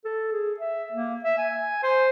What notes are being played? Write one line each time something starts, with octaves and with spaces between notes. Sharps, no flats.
A4
G#4
E5
A#3
E5
G#5
C5